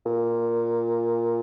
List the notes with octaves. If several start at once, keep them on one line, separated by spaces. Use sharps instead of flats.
A#2